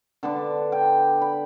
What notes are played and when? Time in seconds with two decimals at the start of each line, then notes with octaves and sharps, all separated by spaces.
0.23 D3 B3 D4 A5
0.72 G5
1.22 B5